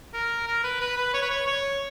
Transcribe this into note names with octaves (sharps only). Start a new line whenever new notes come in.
A#4
A#4
B4
B4
B4
C#5
B4
C#5
C#5